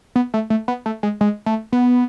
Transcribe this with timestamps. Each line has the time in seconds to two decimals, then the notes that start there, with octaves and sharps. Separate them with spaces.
0.16 B3
0.34 A3
0.50 A3
0.68 B3
0.86 A3
1.03 G#3
1.21 G#3
1.46 A3
1.73 B3